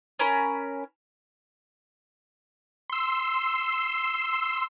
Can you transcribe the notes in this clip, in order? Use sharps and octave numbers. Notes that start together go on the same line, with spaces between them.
C#4 A#4 B5
C6 E6